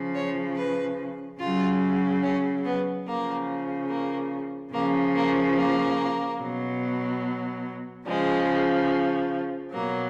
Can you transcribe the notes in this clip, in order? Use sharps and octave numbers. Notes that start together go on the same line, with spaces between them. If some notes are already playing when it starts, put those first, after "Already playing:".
Already playing: C#3 F3
C#5
B4
C#3 F#3 F4
C#4
B3
C#3 F3 A#3
A#3
C#3 F3 A#3
A#3
A#3
B2 F#3
C#3 F3 G#3
B2 F#3 A#3